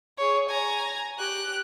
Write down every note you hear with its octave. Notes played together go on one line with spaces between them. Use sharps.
G#4 C#5
G#5 A#5
G4 F#6